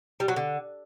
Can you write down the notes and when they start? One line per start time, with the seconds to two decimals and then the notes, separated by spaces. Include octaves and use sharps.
0.20 G3
0.28 F#3
0.36 D3